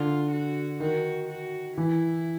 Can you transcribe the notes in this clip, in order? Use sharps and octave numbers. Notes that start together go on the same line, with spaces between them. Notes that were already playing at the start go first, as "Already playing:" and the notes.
Already playing: D3 F4
F#4
D#3 F#4
F#4
E3 E4